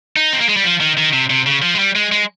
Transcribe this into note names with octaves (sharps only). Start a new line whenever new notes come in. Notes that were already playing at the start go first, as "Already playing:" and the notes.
D#4
C4
A#3
G#3
G3
F3
D#3
D#3
C3
C3
C#3
F3
G#3
G3
G#3
G#3